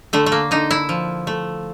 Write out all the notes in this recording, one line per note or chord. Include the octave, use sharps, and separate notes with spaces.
D3 A3
A3
A#3
D3 D#4
E4
F3
A3